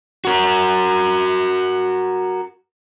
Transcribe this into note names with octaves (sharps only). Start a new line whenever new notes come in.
F#4 A#4